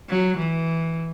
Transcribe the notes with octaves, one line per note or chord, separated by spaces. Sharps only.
F#3
E3